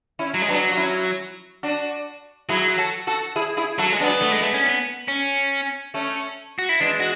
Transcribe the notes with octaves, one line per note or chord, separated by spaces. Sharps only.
C#4 E4
F#3
G#3
F#3 B3 D4
F#4
C#4 E4
D4 F#4
F#3 E4 G#4
F#4 A4
F#4 A4
E4 G#4
E4 G#4
F#3 F#4 A4
G#3
F#3 B3 D4
A3
G#3
A3
C#4
B3
C#4
A3 C#4
F#4
E4
E3 G#3 D4
F#4